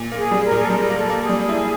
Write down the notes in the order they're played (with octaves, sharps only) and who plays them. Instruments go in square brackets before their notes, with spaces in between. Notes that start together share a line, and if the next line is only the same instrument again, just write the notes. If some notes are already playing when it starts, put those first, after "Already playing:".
Already playing: [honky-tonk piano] A#2
A#3
[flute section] G#4
[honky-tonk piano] G3
[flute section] A#4
[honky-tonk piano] A#2 [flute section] G#4
[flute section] A4
[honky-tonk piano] G3 [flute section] A#4
[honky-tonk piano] A#3
[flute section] A4
[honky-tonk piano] A#3
[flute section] G#4
[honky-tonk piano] G3
E4